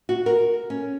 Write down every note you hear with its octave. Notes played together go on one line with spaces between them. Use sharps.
F#4
A#4
C#4